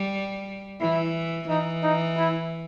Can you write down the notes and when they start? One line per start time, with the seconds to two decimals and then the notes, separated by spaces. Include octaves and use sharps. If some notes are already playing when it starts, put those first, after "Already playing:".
Already playing: G3
0.80 E3 E4
1.49 E3 D#4
1.83 D#4
2.18 E4